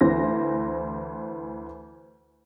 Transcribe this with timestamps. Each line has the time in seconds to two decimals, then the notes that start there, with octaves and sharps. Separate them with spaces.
0.01 D2 E3 C5 A#6